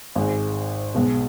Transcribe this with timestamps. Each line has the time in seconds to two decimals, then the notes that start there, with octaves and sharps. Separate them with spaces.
0.15 G#1 G#2 G#3
0.94 B1 B2 G#3